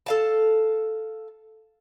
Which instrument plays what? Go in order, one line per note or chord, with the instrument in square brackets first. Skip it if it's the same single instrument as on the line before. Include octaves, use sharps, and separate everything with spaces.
[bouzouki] A4 F5 A5